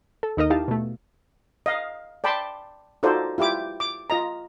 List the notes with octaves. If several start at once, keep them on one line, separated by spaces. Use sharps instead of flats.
A4
D#2 D#4 A#4 D#5
D#4 E4 G4 F5 A5
B2 A3
D#5 F5
D5 G5 A5 B5 C6
D#4 F4 F#4 A4 C5 D5
E4 F4 G4 D6
D6
F4 D#5 A#5